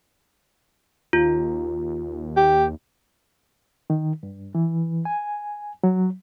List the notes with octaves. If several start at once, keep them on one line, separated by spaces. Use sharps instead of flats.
D#2 F4
G4
D#3
G2
E3
G#5
F#3